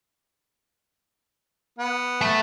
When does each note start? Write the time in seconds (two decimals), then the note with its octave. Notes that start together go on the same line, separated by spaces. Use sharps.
1.79 B3
2.21 A3